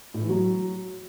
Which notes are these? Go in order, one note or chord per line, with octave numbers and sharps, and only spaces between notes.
A2
E3
F#3